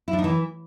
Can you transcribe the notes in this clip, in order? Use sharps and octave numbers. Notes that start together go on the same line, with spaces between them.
E4
D4
D#4
E3